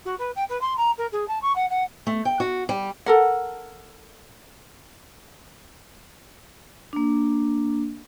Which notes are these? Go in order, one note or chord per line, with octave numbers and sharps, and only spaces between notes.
F#4
B4
G5
B4
C6
A#5
A#4
G#4
A5
C#6
F#5
F#5
A3
G5
F#4
G3
A4 A#4 F#5
A#3 D4